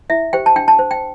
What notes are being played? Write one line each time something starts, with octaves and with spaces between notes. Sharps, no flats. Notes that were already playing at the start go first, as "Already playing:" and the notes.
E4 E5
G4 C5 G5
A5
D4 G5
A5
C5
G5